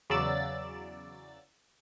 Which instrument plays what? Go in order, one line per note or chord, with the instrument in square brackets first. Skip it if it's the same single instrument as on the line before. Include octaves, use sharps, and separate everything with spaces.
[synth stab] E2 C#3 F#3 D5 E6 A6